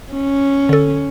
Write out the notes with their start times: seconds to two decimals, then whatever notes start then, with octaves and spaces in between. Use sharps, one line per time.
0.13 C#4
0.69 D3 A4